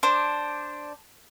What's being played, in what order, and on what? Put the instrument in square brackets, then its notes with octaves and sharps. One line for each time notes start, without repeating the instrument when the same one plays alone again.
[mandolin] D4 C5